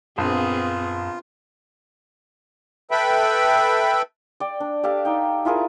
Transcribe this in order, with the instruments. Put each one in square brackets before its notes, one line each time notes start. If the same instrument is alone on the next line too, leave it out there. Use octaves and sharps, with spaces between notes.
[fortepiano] A#1 [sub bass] F#2 [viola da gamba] B3 C4 G#4 [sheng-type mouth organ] F4
[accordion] A4 B4 E5 G5 B5
[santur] D5 G5
D4
G4 A4 F5
D#4 G5
E4 F4 G#4 A#4